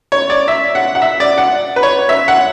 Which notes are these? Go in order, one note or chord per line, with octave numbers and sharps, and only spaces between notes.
C#5
D5
E5
F#5
F#5
E5
D5
F#5
B4
C#5
E5
F#5